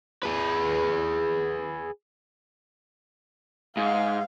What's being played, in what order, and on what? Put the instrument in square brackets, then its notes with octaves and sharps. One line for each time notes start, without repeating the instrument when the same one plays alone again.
[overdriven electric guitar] G#4 B4
[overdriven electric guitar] G#2 [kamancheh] F5